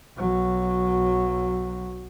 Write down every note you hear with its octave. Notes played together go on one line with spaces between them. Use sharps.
B1 F#3